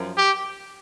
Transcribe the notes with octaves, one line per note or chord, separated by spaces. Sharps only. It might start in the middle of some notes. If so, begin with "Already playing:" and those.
Already playing: F#2 F3
G4